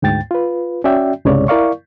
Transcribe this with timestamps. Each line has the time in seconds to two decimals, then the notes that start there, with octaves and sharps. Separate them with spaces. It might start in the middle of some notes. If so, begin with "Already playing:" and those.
0.02 D2 G#2 G5 A6
0.31 F4 B4
0.84 C#4 F#4 D5 E5 G5
1.25 C2 G2 C#3 G#3 C#5 D5
1.48 E4 A#4 D5 F5 C#6